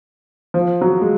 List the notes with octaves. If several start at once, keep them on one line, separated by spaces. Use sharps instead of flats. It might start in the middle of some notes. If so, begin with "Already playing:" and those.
F3
F#3
G#3